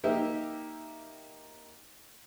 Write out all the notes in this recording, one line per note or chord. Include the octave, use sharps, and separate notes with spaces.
A#3 D#4 G4 E5 G5